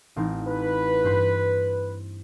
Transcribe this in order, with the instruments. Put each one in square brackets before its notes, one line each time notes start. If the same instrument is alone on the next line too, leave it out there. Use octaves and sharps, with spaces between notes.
[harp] A1 C4 D#4
[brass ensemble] B4
[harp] G2 C5 C6